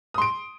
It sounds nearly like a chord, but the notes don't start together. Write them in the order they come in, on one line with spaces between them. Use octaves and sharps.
D#6 C6 D7